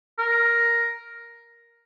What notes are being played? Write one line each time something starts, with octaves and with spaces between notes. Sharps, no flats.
A#4